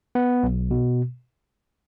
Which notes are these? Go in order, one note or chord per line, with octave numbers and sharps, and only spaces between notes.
B3
B1
B2